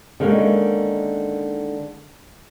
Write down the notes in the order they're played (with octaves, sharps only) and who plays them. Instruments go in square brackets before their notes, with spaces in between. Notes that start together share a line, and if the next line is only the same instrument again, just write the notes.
[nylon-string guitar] D3 D#3 G#3 A#3 C#4